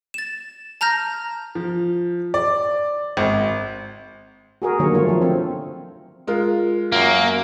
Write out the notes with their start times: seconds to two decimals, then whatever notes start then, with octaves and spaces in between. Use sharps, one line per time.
0.14 A6 E7
0.81 A5 A#5 F6 G6 A#6
1.55 F3
2.34 D5
3.17 G#1
4.62 F#4 G#4 A#4
4.79 D3 D#3 F#3 A#3 C#5
4.94 D3 F3 A3 F4 C#5
5.09 F3
5.22 C4
6.27 G#3 F4 A#4
6.92 F#2 A#3